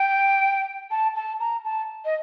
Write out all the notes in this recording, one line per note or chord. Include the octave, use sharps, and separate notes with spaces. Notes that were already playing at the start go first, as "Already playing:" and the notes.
Already playing: G5
A5
A5
A#5
A5
D#5